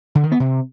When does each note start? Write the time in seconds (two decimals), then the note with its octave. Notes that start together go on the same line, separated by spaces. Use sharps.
0.15 D3
0.23 D#3
0.32 B3
0.40 C3